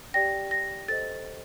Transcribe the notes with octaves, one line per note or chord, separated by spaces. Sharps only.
G4 D5 G5 A#6
A#6
A4 C5 D#5 A6